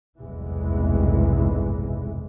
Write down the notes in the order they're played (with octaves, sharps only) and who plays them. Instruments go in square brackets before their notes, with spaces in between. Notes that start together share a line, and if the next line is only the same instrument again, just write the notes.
[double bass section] F1 B1 E2 G2 E3 G#3